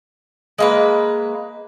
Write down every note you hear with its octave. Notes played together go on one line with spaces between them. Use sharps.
G#3 A#3 B4